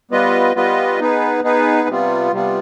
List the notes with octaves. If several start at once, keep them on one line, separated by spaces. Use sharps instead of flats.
G3 B3 F4 B4 D#5
G3 B3 F4 B4 D#5
B3 D#4 G#4 B4
B3 D#4 G#4 B4
C3 G3 B3 F4
C3 G3 B3 F4